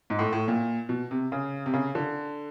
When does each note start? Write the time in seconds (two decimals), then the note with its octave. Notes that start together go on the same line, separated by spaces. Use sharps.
0.10 G#2
0.19 A2
0.33 A2
0.48 A#2
0.89 B2
1.11 C3
1.32 C#3
1.66 C3
1.73 C#3
1.95 D3